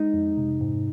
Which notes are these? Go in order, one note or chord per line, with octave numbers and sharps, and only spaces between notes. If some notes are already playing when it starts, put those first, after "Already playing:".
Already playing: G#3 D#4
F2
C3
G#2